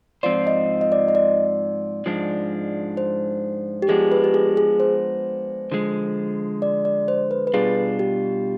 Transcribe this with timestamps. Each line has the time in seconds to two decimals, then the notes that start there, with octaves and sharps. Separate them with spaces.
0.23 G#2 F3 C4 F4 C5 D5
0.47 D#5
0.81 D#5
0.92 D5
1.08 D#5
1.15 D5
2.06 G#2 F3 G#3 D4
2.97 C5
3.82 G4
3.89 F3 G#3 B3 D4 G#4
4.12 B4
4.24 G4
4.34 G#4
4.57 G#4
4.80 C5
5.72 D3 F3 G#3
6.62 D5
6.85 D5
7.08 C5
7.31 B4
7.47 B4
7.54 B2 G3 D4 F4 G#4
7.99 G4